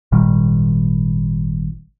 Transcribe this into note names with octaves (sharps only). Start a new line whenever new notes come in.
G#1 A#2 D#3 G3